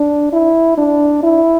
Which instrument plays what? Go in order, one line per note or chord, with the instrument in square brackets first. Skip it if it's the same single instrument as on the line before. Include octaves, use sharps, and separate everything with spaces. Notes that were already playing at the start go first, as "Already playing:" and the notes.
Already playing: [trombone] D4
E4
D4
E4